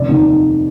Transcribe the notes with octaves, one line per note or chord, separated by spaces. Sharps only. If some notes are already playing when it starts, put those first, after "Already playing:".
Already playing: F1 D5
D#2 D#3